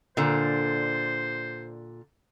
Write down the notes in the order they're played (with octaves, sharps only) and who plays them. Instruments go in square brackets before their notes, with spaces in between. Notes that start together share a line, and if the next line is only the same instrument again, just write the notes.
[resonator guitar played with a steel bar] A#2 D3 [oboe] C5